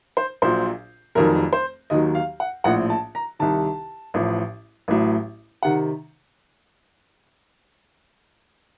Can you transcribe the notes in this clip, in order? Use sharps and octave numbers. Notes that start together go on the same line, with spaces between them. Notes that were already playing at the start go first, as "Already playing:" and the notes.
C5
A#1 A#2 F#3 C5
F1 F2 D#3 F#3 A#4
C5
D#2 D#3 F#3 D#5
F5
F#5
A#1 A2 F3 F#5
A5
A#5
C2 C3 D#3 A5
A1 A2 F3
A1 A2 F#3
C3 D#3 F#5